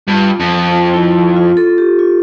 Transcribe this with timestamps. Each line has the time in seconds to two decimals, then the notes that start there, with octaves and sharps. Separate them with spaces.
0.08 G2 F4
0.40 F2
0.72 F4
0.93 E4
1.36 F4
1.57 A4
1.78 G4
1.99 F4